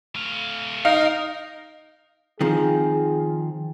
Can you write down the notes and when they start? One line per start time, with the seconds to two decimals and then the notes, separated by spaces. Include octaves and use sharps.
0.15 A3 F5
0.85 D#4 A#4 F5
2.41 D#3 F3 C4 G#4